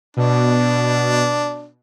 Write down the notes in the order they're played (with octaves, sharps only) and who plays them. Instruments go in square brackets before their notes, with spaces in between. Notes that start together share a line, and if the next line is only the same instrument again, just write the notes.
[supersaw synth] B2 [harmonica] D4